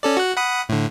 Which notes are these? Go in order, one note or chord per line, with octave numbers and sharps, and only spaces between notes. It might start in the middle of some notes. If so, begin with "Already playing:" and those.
C#4 A4 D5
F#4 F#6
F#5 B5 D#6
A2 D3